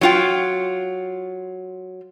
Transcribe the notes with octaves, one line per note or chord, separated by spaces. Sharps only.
F#3 F4 G5